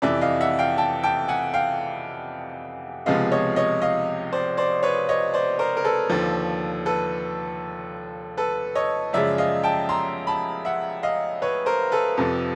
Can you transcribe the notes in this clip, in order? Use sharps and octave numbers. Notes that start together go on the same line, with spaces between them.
F2 C3 E3 D5 E5
D#5 F5
E5 F#5
F5 G5
G5 A5
G5 A5
F#5 G#5
F5 G5
C#2 C3 F3 G#3 B3 D#5 F5
C#5 D#5
C#5 D#5
D#5 F5
C5 D5
C5 D5
B4 C#5
C#5 D#5
C5 D5
A#4 C5
A#4
A4 B4
D#2 D3 F3
A4 B4
A4 B4
C#5 D#5
F#2 C#3 F3 G#3 D5 E5
D#5 F5
G5 A5
A#5 C6
A5 B5
E5 F#5
D#5 F5
B4 C#5
A#4 C5
A4 B4
F2 C3 F3